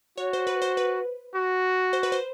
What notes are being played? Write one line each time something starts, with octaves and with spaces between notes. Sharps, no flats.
F#4 C#5
C5
B4
C5
B4
F#4
C5
B4
C5